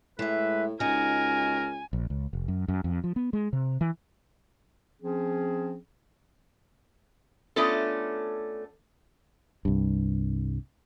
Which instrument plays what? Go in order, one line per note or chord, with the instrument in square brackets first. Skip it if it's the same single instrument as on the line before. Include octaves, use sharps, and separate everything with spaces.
[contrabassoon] A2 [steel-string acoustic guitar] G#3 E5 [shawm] B4
[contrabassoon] C#2 [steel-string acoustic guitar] D#4 F#4 [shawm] A#4 [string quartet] G#5
[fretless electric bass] A#1
C#2
F1
F#2
F#2
F2
F3
B3
G#3
C3
E3
[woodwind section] F3 C4 C#4 G#4
[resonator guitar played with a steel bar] A3 B3 C#4 D4 F4 A4
[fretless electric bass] C2 G2